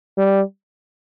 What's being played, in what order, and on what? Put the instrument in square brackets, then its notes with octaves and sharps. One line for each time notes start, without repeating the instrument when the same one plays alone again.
[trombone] G3